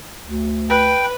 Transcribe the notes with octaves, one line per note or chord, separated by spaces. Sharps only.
D2
B4 G5